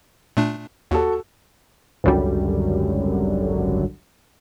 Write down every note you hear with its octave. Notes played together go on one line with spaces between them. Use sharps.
A#2 A3 D4
D#2 F#4 A4
G#1 C#2 F#2 D3 F#3 G3